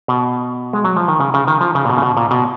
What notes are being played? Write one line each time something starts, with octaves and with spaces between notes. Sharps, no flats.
B2
G#3
F#3
F3
D#3
C#3
C#3
D#3
F3
C#3
A#2
B2
C#3
B2
A#2
B2